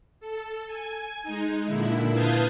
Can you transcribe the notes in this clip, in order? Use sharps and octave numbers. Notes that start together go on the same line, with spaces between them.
A4
G#5
G#3 D#4
A#2 D3 E4
B4 F5 A5 D#6 G6 G#6